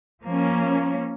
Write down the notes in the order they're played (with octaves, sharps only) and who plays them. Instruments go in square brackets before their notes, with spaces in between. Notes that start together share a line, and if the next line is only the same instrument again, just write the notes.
[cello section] F3 A#3 C#4